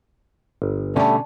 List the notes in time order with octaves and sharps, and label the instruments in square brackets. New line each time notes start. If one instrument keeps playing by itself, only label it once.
[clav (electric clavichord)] G1
[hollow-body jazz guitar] B2 D3 C#4 [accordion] G3 A3 [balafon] D5 A5